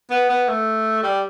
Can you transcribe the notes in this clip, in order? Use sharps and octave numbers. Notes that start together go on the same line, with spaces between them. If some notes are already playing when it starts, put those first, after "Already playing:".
B3
B3
A3
G3